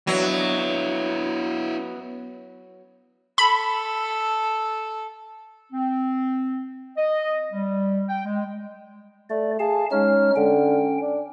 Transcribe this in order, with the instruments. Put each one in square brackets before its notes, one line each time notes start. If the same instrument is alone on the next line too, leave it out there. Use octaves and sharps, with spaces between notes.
[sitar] F#3 [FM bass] B3 [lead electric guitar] D4 E4
[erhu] A4 [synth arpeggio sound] B5
[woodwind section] C4
D#5
G3
G5
G#3
[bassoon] A3 [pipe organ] D5
[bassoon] G#4 [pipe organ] F5 A5
[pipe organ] G#3 D#4 F6 [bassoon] C#4
[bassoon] D3 [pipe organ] C#4 G5
[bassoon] D4